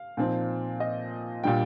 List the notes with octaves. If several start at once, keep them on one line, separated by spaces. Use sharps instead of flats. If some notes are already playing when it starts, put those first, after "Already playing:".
Already playing: F5
A#2 F3 C4 D#4
D#5
A#2 G3 D4 G5